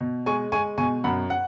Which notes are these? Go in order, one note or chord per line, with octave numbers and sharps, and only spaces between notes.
B2
G#3 G#5 C#6
G#3 G#5 C#6
B2 G#5 C#6
F#2 F#5 B5
F#5